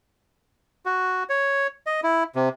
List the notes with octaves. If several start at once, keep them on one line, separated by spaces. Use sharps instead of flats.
F#4
C#5
D#5
E4
C3